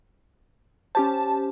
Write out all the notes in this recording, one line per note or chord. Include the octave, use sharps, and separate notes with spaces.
C#4 G4 C5 A5